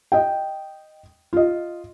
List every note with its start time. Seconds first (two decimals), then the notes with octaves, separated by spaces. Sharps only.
0.12 D#5 G5
1.33 F4 D#5